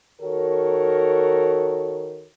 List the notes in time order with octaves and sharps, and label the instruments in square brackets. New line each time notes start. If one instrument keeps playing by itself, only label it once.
[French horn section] D#3 F#4 A4 A#4 C#5